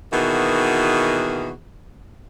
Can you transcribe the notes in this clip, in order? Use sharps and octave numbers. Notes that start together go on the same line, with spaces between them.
B2 D#3 E3 A#3 F#4 G#4